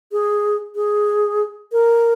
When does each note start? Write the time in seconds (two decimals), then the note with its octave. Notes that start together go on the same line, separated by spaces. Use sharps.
0.12 G#4
0.76 G#4
1.72 A#4